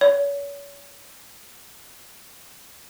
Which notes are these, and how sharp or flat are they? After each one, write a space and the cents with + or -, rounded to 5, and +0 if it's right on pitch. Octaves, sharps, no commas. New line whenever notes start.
C#5 +35